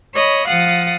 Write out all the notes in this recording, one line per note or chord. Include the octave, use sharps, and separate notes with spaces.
C#5 D#5 B5
F3 F5 F#5 D#6 A6